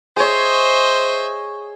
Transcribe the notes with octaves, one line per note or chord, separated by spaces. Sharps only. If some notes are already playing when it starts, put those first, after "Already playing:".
G#4 C5 C#5 D#5 E5